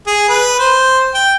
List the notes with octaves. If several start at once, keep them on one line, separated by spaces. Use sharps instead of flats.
G#4
B4
C5
G5